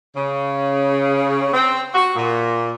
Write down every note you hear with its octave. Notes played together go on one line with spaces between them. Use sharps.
C#3
C4
F#4
A#2